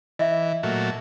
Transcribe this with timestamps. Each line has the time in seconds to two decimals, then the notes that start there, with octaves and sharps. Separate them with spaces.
0.19 E3 D#5 E5
0.63 A#2 F#3 A3